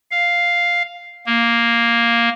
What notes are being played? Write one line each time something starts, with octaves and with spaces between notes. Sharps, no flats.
F5
A#3